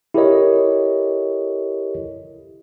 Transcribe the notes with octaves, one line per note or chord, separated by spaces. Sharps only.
E4 G4 A4 A#4 C#5 D#5